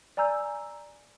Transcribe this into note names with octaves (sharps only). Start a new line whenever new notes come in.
D5 G#5 A#5 E6 G6